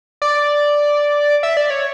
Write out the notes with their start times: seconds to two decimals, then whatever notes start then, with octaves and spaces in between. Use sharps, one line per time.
0.22 D5
1.43 E5
1.57 D5
1.70 C#5